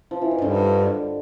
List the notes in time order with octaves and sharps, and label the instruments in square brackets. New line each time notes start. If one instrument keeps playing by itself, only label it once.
[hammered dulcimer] F3
E3
D#3
[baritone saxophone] G2 [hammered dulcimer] D3